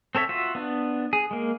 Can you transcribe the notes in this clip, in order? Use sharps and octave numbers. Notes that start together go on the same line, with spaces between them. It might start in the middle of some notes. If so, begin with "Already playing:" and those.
C4 A4 C#5 E5
F4 F#4 E5
B3 D4
G#4
G#3 A#3